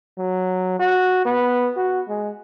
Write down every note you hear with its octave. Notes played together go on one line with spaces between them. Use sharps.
F#3
F#4
B3
F#4
G#3